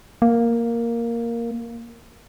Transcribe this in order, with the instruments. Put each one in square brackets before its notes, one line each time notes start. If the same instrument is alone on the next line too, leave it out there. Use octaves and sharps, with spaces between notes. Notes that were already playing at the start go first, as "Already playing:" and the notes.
[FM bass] A#3